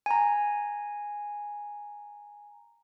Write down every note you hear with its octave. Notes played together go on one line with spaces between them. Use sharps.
G#5 A#5